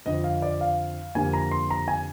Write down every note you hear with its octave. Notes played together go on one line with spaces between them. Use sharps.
F2 D3 F3 D#5
F5
D5
F5
F2 D3 G3 A#3 G#5
A#5
C6
A#5
G#5